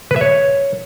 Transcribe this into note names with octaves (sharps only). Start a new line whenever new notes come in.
B4
E5
C#5